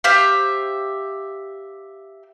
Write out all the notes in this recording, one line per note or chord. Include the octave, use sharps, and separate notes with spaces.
G4 C5 E5 F5